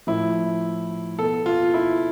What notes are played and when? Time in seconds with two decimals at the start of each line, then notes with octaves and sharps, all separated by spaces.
0.07 A2 F3 E4
1.18 B2 A4
1.46 F4
1.74 E4